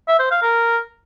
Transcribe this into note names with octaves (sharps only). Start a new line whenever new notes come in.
E5
C5
F5
A#4